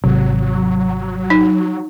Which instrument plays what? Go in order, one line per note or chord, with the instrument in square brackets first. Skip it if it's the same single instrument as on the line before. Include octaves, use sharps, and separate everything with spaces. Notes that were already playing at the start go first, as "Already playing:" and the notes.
[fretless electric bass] G#1 C3 [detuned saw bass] F#3
[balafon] D#4